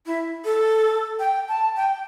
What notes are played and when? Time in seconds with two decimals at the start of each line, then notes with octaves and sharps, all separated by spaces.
0.06 E4
0.45 A4
1.19 G5
1.48 A5
1.76 G5